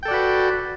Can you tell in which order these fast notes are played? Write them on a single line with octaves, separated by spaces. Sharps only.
G5 A4 D5 F#4 B4